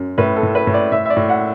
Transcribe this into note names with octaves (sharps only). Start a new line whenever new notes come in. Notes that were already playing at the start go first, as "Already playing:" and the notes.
Already playing: F#2
A2 B4
A4
A2
B4
A2
D5
A2 E5
E5
D5
A2
F#5